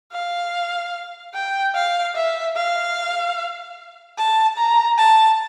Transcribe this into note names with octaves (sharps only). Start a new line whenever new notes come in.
F5
G5
F5
E5
F5
A5
A#5
A5